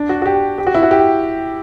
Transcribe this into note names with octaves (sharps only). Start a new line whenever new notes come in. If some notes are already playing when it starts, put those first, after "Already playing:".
Already playing: D4
F#4
F#4
G4
G4
F#4
E4
F#4
G4